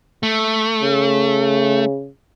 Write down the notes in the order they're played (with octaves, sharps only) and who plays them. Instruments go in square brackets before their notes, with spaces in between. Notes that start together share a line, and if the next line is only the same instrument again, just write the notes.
[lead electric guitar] A3
[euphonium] C#3